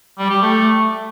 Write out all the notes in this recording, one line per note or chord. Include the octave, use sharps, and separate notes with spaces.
G3
G4
A3